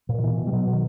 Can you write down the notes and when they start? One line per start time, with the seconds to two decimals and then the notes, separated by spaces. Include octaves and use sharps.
0.09 A#2
0.18 D#3
0.23 B2 E3
0.37 B2
0.47 G3
0.53 B2 F#3
0.67 B2
0.73 D#3